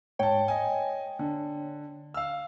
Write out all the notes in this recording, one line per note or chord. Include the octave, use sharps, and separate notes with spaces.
G#2 C#5 G5 A5
D#5 G#5
D3
F5 E6